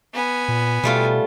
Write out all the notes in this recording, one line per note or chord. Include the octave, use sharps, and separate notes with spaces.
B3 G#5
A#2
B2 G3 A3 F4